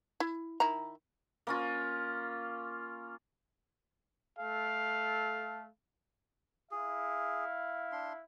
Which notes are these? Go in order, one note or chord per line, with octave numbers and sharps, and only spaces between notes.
E4
D#3 E4 A#5
A#3 C#4 F4
A3 A4 F5
E4 G#4 F5
D4 C6